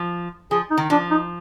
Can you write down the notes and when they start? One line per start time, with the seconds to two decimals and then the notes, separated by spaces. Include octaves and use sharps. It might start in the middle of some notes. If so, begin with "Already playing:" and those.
Already playing: F3
0.51 F3 G#4
0.71 D#4
0.78 D#3
0.90 F3 D4
1.11 D#4